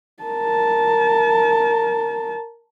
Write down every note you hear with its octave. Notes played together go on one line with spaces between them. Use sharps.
A#4 A5